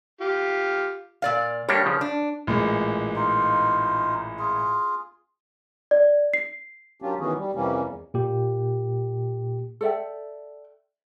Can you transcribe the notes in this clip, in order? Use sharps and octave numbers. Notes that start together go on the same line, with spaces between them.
F4 G4
A#2 D5 F5
G3 A#3 D4 C#5
C#3 F3
D4 D5
A1 A#2 G#3
D#4 F4
F4 G#4
D5
C7
F#3 A#3 C#4 D4 F4 G4
D#3 E3 B3 C#4 F#4 G#4
G3
F2 C3 E3 G3 A#3 C#4
E2
A#2 G4
A4 D5 E5 G5